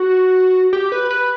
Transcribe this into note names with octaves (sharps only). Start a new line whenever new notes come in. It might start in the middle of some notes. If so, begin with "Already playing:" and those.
Already playing: F#4
G4
B4
B4